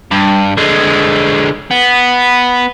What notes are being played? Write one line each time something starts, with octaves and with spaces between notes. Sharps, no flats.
G2
D3 G#3
B3